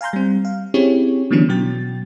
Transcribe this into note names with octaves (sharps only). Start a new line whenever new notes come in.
F5 G#5 A#5 C6 G6
G3 C4
F5
C4 C#4 E4 G4 G#4 C#5
D3 E3 F#3 B3 C#4 D4
B2 F#3 F#4 G5 A6